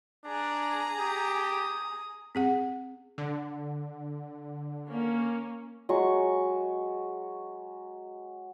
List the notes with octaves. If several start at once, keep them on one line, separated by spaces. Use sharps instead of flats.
D4 G#4 A#5
G4 D#6
C4 G#4 F#5
D3
A#3 C#4
F#3 G#3 C#6